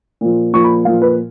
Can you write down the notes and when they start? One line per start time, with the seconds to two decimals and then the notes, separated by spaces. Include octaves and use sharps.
0.21 A#2 F3
0.53 A#2 F3 C#6
0.64 B5
0.85 A#2 F3 F5
1.02 B4